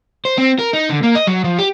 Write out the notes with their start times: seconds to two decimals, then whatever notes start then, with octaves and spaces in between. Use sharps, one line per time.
0.25 C5
0.38 C4
0.59 A#4
0.73 D#4
0.89 D3
1.03 A#3
1.15 D#5
1.27 F#3
1.44 F3
1.58 G4